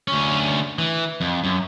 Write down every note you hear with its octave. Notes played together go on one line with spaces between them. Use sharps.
D2 C#4
E3
F2
F#2